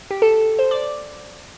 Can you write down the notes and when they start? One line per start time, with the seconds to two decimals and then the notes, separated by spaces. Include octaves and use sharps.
0.11 G4
0.22 A4
0.59 C5
0.71 D5